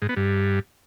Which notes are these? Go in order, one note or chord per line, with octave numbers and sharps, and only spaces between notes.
G#2
B3
G2